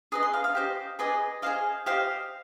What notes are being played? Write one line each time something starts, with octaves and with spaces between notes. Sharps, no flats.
G#4 B4 D#5 D#6
C6
F5
F5
G4 C5 D#5
G#4 B4 D5 D#5
G#4 C5 D#5 F5
G4 C5 D#5 F5